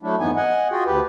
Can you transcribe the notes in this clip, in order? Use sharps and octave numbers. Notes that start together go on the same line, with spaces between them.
F#3 A3 D4 E4
F2 G#2 E3 B3 D#4 G#5
D#5 F#5 G#5
F4 F#4 G#4 G5
D2 G4 B4